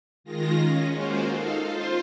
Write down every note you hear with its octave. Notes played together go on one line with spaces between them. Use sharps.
D#3 G#3 F4 A#6
C#4
G#3 A#3 F4 F#4 C5
D#4 A4 F5
F4 C5